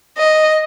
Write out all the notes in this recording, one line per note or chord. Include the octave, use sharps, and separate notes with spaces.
D#5